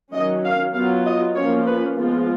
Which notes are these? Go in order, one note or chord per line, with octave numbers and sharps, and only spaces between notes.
D#3 F#3 C#4 D#5
F5
F#3 B3 F4 F5
D#5
F3 A#3 C#4 F4 C#5
B4
F3 G#3 B3 F4